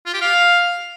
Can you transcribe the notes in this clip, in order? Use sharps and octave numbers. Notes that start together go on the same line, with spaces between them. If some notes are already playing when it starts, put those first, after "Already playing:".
F4
G4
F5